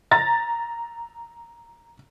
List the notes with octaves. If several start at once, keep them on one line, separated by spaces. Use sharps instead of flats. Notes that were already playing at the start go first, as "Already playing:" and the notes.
A#5 A6 A#6